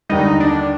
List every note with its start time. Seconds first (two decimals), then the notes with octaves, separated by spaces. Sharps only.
0.09 D#2 D3 G3 D#4
0.40 D4